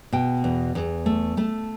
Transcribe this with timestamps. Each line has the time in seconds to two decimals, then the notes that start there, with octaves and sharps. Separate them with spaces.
0.13 B2 G5
0.44 E2
0.75 E2
1.06 A3
1.37 A3 A5